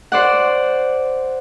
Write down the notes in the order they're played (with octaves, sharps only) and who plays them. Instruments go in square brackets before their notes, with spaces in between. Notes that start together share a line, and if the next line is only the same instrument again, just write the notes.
[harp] C5 D5 F#5